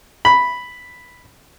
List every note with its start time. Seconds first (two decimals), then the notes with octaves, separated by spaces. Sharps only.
0.25 B5